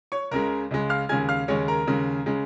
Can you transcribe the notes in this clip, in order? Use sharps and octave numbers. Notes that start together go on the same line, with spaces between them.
C#5 C#6
C#2 C#3 G#3 A#4 A#5
C#2 C#3 G#3
F5 F6
D#2 C#3 G#3 G#5 G#6
F5 F6
D#2 C#3 G#3 C#5 C#6
A#4 A#5
D#2 C#3 G#3
C#3 G#3